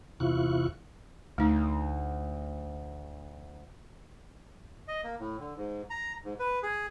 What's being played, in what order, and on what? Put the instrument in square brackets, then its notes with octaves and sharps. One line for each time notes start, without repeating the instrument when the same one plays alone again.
[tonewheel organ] E2 C3 E4 F4 C#6 F#6
[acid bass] D2 [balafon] A3 D#4
[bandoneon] D#5
A#3
A2
D3
G#2
A#5
G#2
B4
G#4